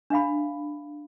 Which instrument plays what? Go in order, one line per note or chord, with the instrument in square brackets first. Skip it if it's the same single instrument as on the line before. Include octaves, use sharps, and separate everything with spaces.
[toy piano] D4 E5 F5 B5